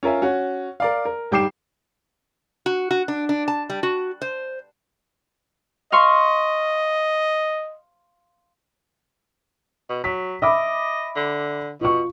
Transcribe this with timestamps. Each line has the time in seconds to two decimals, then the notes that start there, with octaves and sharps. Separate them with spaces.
0.03 C#4 F4 A#4 E5 G#5
0.22 C#4 F#4
0.80 A#4 D5 F5
1.05 A#4
1.31 G#2 G3 G5 D6 C7 E7
2.66 F#4
2.91 F#4
3.08 D4
3.29 D4
3.48 A5
3.70 G3
3.83 F#4
4.22 C5
5.92 D#5 F5 C6 C#6
9.90 B2
10.04 F#3 B6
10.42 D#5 E5 B5 D6
11.16 D3
11.81 B2 F4 C#6